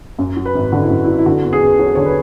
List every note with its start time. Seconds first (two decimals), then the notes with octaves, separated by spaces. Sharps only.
0.19 F#2
0.36 F#3
0.45 B4
0.55 G#1
0.72 D3 F#4
0.82 E4
0.90 F#2
1.04 E4
1.07 F#3
1.18 E4
1.26 D3 F#4
1.44 E2
1.53 G#4
1.61 E2
1.79 F#3 C#5
1.95 D3 C#5
2.06 B4